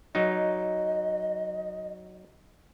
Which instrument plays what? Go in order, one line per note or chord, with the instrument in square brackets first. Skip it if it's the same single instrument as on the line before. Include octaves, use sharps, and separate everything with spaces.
[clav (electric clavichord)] F#3 D#4 [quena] D#5